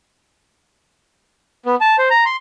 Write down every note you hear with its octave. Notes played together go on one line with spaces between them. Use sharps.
B3
A5
C5
A#5
C6